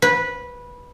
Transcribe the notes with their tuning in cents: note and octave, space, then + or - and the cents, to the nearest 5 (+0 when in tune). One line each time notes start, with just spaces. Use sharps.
B4 -15